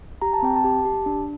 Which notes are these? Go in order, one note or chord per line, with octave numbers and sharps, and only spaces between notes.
G4 A#5
A5
C4 G5
A5
G4
G4
D4